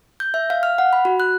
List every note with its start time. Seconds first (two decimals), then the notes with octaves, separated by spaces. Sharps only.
0.20 G6
0.34 E5
0.50 F5
0.63 F6
0.78 F#5
0.93 B5
1.05 F#4
1.20 F#6